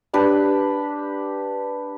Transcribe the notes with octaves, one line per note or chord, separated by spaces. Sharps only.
D4 G4 B4